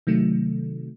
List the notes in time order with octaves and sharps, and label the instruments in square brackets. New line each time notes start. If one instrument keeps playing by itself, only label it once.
[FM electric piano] C3 D#3 F#3 A3